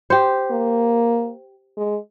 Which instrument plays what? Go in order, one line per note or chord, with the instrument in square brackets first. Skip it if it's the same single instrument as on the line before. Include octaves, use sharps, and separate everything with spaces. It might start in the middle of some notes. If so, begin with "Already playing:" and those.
[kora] G4 C5
[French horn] A#3
G#3